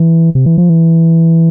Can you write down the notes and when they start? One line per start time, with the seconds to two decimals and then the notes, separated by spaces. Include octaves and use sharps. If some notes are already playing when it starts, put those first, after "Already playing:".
Already playing: E3
0.35 C3
0.46 E3
0.58 F3
0.69 E3